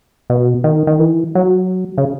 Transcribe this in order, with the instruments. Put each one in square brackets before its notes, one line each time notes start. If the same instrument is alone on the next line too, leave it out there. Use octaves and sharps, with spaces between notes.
[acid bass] B2
D#3
D#3
E3
F#3
C#3